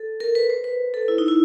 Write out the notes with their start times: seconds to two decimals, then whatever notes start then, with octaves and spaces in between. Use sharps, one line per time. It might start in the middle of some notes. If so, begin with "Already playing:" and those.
Already playing: A4
0.20 A#4
0.35 B4
0.50 C5
0.64 B4
0.94 A4
1.08 E4
1.18 D#4
1.28 E4